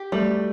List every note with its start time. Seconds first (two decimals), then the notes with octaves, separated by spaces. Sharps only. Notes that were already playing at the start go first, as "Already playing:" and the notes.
Already playing: G4
0.12 G3 A3